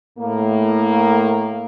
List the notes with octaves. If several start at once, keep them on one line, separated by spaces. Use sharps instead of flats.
A2 A#3